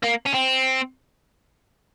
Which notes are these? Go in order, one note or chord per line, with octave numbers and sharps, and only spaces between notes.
A#3
C#4
C4